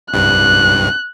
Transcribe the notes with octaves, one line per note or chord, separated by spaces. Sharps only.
C2 G2 F#6